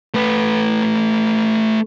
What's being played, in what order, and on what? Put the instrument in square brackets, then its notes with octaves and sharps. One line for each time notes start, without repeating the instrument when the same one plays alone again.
[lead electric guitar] A3 B4